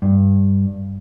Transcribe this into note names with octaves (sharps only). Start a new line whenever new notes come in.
G2